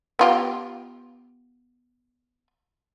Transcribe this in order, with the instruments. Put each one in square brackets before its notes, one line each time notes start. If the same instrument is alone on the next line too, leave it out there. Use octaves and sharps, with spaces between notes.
[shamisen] B3 F4 G4